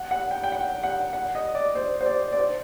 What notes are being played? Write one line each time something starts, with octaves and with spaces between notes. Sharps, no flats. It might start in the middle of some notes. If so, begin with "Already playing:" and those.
Already playing: F#5
F#5
G5
G5
F#5
F#5
F#5
D#5
D5
C5
C5
D5
D5
C5